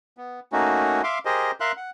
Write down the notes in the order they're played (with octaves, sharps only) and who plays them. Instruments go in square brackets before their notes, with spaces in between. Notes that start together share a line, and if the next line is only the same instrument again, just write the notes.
[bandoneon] B3
A3 A#3 C#4 D#4 F#4
E5 F5 C6 D6
G4 G#4 A#4 C5 D#5
A#4 E5 F5 C6 F#6
F#5